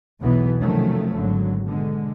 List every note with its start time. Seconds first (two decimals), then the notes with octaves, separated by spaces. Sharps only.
0.19 B1 E2 B2 E3 B3
0.59 C3 D#3 F3 F#3 A3 C#4
1.14 G#1 D3 F#3
1.64 B2 D3 G#3